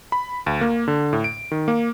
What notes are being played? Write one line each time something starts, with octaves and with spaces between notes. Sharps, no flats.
B5
D2
A#3
D3
A2
D7
D#3
A#3